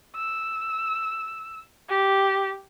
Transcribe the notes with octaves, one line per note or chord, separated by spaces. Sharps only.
E6
G4